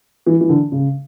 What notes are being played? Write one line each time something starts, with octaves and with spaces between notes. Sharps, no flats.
E3
E3
D3
C#3